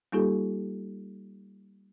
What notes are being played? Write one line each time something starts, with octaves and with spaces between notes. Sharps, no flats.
G3 A#3 D#4 F4 G4 A4